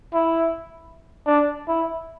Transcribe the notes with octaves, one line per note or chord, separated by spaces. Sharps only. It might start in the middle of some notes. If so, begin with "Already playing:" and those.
E4
D4
E4